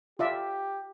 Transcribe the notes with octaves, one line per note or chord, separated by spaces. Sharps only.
F4 G4 D5 E5